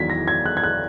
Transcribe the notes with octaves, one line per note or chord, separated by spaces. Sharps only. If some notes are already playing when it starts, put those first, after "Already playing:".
Already playing: E2 D#3 F#3 G#6 B6
A#6
G#6
F#6
G#6
F#6